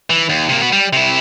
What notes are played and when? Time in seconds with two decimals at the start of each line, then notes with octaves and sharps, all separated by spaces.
0.10 E3
0.29 D#2
0.49 C3 A#3
0.61 B3 F#4
0.73 G3
0.93 C3 E4